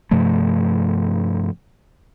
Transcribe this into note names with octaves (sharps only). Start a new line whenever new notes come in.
G2 C3 F3 A3